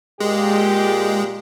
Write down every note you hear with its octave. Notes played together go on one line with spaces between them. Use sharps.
A#2 G#3 G4